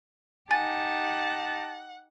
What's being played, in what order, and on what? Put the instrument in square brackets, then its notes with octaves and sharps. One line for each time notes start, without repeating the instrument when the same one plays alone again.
[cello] D#4 G4 [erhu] F#5 [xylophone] G#5 A6 [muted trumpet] A5